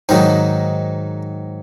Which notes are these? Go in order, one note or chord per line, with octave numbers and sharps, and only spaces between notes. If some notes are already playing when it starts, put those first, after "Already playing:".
G#2 D#3 F#3 D#4